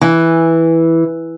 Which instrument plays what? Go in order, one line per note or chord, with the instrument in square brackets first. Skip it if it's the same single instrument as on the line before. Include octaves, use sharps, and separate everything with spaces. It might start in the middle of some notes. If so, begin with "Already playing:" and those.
[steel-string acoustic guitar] E3